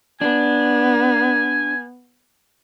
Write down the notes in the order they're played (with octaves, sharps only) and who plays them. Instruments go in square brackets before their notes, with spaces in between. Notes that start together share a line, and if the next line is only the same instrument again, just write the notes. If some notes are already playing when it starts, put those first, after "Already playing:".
[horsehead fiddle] B3 [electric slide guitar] D4 [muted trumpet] G#5